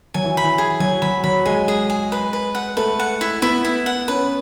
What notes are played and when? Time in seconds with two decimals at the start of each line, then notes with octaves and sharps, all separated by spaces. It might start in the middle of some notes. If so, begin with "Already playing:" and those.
0.14 F#3 G#5
0.24 E3
0.37 B5
0.43 E3
0.58 G#4
0.80 F#3 G#5
1.02 F#3 B5
1.24 F#3 B5
1.45 G#3 G#5
1.68 G#4
1.90 G#4
2.12 B4
2.33 B4
2.55 F#5
2.77 A3 B4
3.00 F#5
3.21 E4
3.42 B3 E4
3.65 E4
3.86 F#5
4.08 C#4 B4